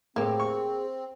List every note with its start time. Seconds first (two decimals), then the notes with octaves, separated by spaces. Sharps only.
0.16 A2 A#3 C4 G4 G#4
0.40 C#6